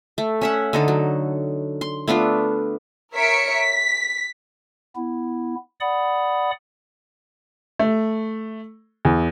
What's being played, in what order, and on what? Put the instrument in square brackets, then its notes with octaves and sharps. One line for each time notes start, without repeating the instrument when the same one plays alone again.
[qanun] A3
C#4 E5 F#5
D3 D#4 A4
F#3
C6
A3 B3 D4 F4
[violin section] A#4 C#5 E5 B6 C#7 D7
B6
[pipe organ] B3 E4
D5 F#5 B5 D#6
[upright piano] A3
E2